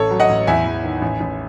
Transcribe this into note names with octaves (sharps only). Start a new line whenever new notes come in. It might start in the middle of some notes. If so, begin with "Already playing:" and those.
Already playing: A1 A4 C#5
F#3
D#5 F#5
A1
E2 E5 G#5
E2
D#3
A1
A1